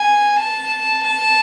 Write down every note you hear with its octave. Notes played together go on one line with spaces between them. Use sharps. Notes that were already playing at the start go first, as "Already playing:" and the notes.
Already playing: G#5
A5
A5